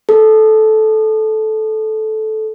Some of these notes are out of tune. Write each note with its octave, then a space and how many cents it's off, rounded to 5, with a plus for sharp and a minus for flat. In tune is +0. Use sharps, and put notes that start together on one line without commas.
A4 -15